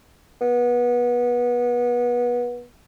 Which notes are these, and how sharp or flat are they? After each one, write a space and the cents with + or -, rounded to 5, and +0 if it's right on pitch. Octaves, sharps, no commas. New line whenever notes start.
B3 -25